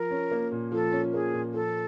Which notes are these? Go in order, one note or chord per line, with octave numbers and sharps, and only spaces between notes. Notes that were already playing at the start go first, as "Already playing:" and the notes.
Already playing: F3 A#4
C#4
A#3
A#2
F3 A4
C#4
A#3 G#4
A#2
F3 A4